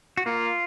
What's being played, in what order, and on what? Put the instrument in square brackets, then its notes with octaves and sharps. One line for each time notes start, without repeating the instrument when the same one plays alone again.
[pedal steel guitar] F#4
[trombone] A#3 [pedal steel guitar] F4